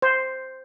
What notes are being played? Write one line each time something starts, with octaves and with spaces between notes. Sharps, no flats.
C5